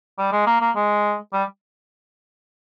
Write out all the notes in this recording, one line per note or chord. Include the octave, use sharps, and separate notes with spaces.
G3
G#3
A#3
A#3
G#3
G3